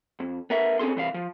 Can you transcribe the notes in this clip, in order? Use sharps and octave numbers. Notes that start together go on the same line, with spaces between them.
F2
B3 A#4 E5
C4 C#4 G#4 A4 C6
C2 E3 C5 F5
F3